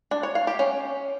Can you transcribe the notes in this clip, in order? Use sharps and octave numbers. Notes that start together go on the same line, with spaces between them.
D4
C#5
F5
G4
C#4